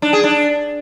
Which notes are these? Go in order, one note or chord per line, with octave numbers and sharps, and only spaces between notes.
D4
G#4
D4